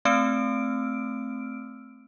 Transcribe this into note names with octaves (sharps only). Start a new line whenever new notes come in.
A3 C4 E6 F6 D7